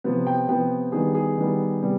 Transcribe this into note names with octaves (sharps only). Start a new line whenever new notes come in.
C3 F3 B3
G5
C3 F3 B3 G5
D#3 G3 B3 G#4
G#4
D#3 G3 B3
C3 G3 B3